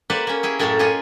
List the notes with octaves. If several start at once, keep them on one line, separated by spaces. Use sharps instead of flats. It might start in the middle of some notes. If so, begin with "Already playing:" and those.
A#3 G4 B4 C5 D5 F#5
A#3 C#4
E4 G#4 G5
F#2 A2 A3 A#3 A4
F4 G4 G#4 C#5 D#5